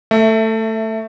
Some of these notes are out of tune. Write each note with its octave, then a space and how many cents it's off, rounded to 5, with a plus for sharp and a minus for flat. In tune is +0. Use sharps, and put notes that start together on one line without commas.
A3 +15 E5 +0